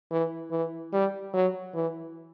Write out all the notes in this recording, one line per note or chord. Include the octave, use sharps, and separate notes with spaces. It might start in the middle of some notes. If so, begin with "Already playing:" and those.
E3
E3
G3
F#3
E3